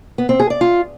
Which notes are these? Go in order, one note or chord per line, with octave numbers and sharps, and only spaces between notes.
B3
C4
G#4
D5
F4